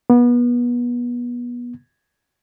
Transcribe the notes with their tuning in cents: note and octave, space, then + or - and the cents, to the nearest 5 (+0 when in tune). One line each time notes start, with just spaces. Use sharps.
B3 -30